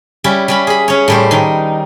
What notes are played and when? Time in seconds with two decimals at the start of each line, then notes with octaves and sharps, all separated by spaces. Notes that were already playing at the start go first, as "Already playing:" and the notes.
0.24 G3 C#4 E4
0.48 G3 C#4 B5
0.67 G#4 B5
0.88 C#4 C#5
1.08 A2 G3 C5
1.31 D#3 D#4